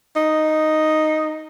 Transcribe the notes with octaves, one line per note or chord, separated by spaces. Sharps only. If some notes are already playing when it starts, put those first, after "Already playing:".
D#4